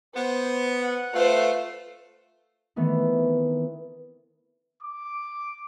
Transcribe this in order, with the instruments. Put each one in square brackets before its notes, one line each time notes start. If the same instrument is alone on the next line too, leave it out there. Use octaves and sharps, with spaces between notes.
[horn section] B3 [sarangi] C5
[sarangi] F#5
[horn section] A3 [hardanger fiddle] F4 C5 [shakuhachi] B4
[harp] D#3 E3 A3 B3 C4 D#4
[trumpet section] D6